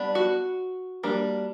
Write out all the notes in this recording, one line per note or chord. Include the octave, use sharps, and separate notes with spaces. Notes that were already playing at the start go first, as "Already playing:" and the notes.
Already playing: G3 B3 D4
F#4
G3 A#3 D4